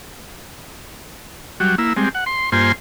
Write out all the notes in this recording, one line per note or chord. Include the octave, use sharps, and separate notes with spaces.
F#3 G3 F#4
A#3 E4 E6
G3 G#3 C4
F#5
C6
G2 A#3 F4 C5 G#5 C6